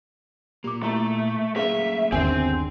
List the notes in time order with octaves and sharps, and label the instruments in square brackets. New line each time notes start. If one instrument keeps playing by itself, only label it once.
[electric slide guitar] A#2 A#3 [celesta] G4 D6
[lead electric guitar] A3 [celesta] E4 A#5
[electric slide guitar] A3 A#3 C#4 [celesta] G#4 F5 [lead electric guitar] E5
[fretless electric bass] G1 D#2 D3 [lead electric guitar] C4 [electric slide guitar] G#4 [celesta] G#5